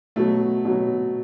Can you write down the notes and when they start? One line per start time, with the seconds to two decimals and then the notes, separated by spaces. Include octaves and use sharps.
0.16 B2 F#3 A3
0.65 B2 F#3